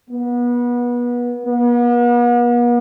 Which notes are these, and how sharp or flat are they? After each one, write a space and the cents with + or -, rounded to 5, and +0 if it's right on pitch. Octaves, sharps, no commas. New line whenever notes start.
B3 -30
B3 -45